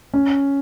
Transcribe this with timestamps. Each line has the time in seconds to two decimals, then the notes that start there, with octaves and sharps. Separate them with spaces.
0.14 C#4